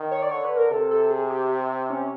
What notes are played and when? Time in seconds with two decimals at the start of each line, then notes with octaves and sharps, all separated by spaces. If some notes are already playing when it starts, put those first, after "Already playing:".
Already playing: D#3
0.11 C#5
0.22 D5
0.31 D3 C#5
0.45 B4
0.57 A#4
0.71 C3 A4
0.91 A4
1.11 G#4
1.30 G4
1.90 C#4